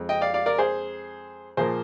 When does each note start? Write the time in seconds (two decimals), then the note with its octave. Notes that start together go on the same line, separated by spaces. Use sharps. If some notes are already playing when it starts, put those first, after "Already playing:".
Already playing: F2 G#3 C4
0.09 D#5 G5
0.21 D5 F5
0.34 D5 F5
0.46 A#4 D5
0.58 G#4 C5
1.57 A#2 F3 A#3 G#4 C5